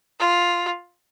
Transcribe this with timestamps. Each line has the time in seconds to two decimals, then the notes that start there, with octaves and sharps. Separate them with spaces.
0.20 F4